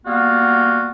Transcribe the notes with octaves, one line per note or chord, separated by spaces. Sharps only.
G3 A#3 B3 F4 F#4